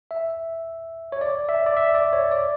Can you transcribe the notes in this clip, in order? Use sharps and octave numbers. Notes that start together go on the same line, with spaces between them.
E5
C#5
D5
E5
D5
E5
D5
C#5
D5